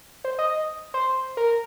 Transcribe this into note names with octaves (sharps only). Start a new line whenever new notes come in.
C5
D#5
C5
A#4